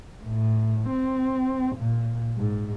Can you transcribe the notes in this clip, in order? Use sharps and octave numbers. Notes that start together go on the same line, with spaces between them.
A2
C4
A#2
G#2